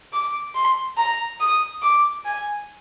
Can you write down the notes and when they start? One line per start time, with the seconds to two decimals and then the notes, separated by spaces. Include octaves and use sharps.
0.13 D6
0.55 C6
0.97 A#5
1.40 D#6
1.82 D6
2.25 G#5